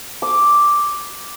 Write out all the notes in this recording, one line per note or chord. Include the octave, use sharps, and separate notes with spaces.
D6